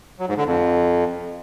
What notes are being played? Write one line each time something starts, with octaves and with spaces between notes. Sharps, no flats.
F#3
G#2
D3
F2